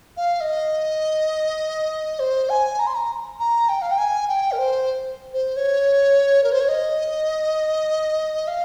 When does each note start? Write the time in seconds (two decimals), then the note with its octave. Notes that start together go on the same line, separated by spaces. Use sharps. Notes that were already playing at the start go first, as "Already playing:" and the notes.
0.17 F5
0.41 D#5
2.19 C5
2.49 G#5
2.79 A#5
2.87 C6
2.94 A#5
3.39 A#5
3.69 G5
3.82 F5
3.91 G5
3.98 G#5
4.28 G5
4.52 A#4
4.58 C5
5.33 C5
5.56 C#5
6.44 A#4
6.52 C5
6.60 C#5
6.68 D#5
8.47 F5